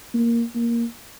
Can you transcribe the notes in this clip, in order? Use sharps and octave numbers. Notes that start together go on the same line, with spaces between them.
A#3
A#3